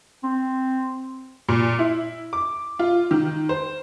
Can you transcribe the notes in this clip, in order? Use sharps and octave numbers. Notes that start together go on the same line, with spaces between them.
C4
A#2
E4
D6
F4
D#3
C5